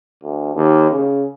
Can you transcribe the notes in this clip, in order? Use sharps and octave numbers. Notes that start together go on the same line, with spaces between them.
D2
D#2
C#3